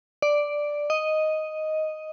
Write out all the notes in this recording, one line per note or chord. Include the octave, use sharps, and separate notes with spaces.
D5
D#5